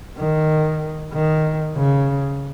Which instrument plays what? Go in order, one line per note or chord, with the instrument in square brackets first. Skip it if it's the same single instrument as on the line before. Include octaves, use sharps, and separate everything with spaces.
[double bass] D#3
D#3
C#3